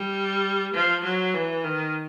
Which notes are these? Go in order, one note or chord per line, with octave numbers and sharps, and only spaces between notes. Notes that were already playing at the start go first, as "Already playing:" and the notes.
Already playing: G3
F3
F#3
E3
D#3